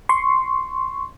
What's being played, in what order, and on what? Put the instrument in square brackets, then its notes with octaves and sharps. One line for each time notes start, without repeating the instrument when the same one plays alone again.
[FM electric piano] C6 C#6